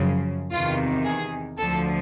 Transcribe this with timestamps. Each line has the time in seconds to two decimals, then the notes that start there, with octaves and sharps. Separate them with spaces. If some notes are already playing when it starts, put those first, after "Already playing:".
Already playing: F#2 C#3 F3
0.52 E2 C3 D#3 F4
1.05 G#4
1.57 D2 D3 F3 A4